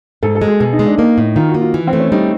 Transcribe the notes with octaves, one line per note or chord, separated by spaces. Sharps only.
G#2 A4
A4
G#3
G#4
B2 G#4
D#4
G#3
D4
A#3 D#4
A2
D#3 F4
F#4
A#3
F4
E3
C4
A3
C#4
G3 D#4